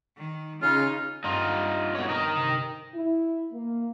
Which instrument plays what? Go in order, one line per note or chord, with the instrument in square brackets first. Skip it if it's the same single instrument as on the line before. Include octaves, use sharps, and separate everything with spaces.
[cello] D#3
[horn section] C#3 [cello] D#4 [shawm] F4
[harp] G2 C4 [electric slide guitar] D#4 F4
[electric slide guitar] B2 C#5
D#4 A#4 D#5
[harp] C3
[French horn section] E4
A#3